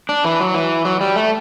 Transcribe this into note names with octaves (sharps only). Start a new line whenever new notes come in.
D4
E3
F#3
E3
F#3
G3
A3